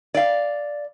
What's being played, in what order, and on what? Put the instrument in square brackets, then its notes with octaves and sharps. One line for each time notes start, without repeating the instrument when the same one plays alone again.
[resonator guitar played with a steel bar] D5 F5